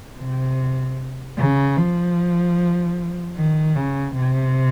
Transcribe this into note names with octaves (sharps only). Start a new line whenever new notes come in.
C3
C#3
F3
D#3
C#3
C3